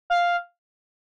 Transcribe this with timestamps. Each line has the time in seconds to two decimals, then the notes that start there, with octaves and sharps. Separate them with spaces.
0.10 F5